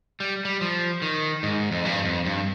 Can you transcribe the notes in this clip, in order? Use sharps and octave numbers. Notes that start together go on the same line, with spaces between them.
G3
G3
F3
D#3
G#2
F2
G2
F2
G2